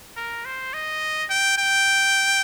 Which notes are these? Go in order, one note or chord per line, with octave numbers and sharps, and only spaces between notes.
A#4
C5
D#5
G5
G5